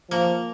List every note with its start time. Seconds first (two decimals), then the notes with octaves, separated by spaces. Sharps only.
0.11 F3 A#3